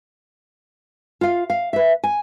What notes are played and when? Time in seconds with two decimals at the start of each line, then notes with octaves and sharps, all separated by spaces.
1.21 F4 F5
1.50 F5
1.73 B4 E5
2.04 G#5